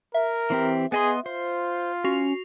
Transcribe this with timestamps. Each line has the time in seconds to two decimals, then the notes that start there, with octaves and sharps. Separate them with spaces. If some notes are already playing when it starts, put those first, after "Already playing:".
0.14 A#4 E5
0.50 E3 C4 G4
0.92 B3 G#4 D#5 C6
1.26 F4 C5
2.04 C#4 F#4 C7 F7